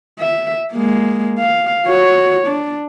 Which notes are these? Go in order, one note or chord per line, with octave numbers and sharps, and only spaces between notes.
E5
G#3 A#3
F5
F#4 C#5
D4